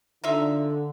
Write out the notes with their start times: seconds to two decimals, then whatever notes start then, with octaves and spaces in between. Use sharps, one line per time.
0.24 D3 D#4 F4 E5